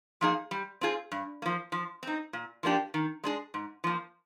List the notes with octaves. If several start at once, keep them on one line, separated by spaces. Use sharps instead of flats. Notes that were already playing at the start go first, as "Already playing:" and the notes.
F3 A#3 D#4 G#4
G3
C4 F4 G#4
G2
F3 A#3
F3
C4 D#4
A#2
F3 A#3 D4 G4
D#3
G#3 D4 G#4
G#2
F3 A#3